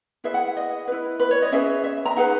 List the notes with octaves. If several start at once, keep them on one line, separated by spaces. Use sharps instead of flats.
E4 G#4 B4 E5
F#5
D#5
E4 B4
B4
C#5
D#5
C#4 G#4 B4 E5
E5
A#5
D#4 G#4 B4 F#5